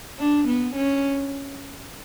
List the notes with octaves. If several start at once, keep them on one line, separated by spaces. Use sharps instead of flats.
D4
B3
C#4